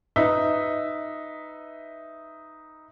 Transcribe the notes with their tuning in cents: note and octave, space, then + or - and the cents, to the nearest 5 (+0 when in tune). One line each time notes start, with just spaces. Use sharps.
D#4 +0 B4 +10 E5 +0